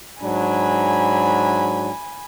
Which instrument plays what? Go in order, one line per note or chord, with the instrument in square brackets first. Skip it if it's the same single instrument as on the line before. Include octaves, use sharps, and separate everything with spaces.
[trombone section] G#2 F#3 D4 [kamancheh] G#5 B5